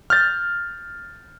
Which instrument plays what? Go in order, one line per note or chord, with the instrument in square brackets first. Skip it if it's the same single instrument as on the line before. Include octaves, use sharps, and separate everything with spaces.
[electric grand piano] F6 G6 A6